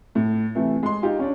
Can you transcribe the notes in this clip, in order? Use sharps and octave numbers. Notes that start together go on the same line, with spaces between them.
A2
C3 E3 A3
G#3 C6
D#4 F4 G4
C#4 D4